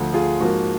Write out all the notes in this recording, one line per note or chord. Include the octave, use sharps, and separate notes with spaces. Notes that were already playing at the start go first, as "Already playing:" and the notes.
Already playing: D2 D3 F3
F4 G#4
G#2 F3 A#3 F#4